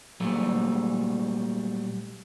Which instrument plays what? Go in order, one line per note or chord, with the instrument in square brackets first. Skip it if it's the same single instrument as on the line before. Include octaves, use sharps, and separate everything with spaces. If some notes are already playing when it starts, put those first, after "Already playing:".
[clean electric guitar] A#2 F#3 G3 A3